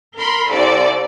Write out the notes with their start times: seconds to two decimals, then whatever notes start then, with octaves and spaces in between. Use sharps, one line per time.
0.17 A#4 B5 C6
0.50 C2 A4 D5